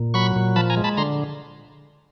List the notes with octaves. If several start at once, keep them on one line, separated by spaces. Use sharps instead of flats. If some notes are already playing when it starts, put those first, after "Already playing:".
Already playing: A#2
F#3 B5 C#6
A#2
F3 A5 B5
G#5 A#5
G#3
A5 B5
D3 A#5 C6